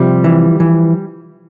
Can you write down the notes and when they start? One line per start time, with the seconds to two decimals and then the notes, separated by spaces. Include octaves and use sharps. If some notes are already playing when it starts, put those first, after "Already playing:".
Already playing: C3 F3 G3
0.24 E3
0.60 E3